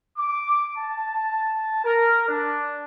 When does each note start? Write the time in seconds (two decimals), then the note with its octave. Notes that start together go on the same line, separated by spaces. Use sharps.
0.17 D6
0.76 A5
1.83 A#4
2.27 D4